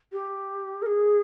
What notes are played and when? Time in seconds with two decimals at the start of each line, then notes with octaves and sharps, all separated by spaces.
0.12 G4
0.82 A#4
0.86 G#4